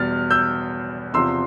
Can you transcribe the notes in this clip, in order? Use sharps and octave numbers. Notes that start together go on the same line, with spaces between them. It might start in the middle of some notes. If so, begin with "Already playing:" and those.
Already playing: E2 B2 G3 F6 A6
E6 G6
E2 C3 F3 C6 E6